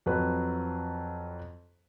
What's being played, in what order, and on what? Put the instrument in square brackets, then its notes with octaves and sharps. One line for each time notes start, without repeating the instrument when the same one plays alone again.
[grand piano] F2 F#3 B4